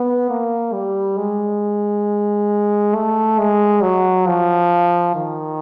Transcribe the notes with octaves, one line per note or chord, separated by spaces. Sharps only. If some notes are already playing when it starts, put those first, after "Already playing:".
Already playing: B3
A#3
G3
G#3
A3
G#3
F#3
F3
D#3